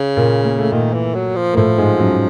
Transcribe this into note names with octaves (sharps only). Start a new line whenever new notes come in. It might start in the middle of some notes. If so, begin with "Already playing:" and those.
Already playing: C#3
A#2 A#3
A#3
A3
A#2 D#3 A#3
E3
F#3
F3
A#3
A2 F3 A3
G#2 G#3
F#2 F#3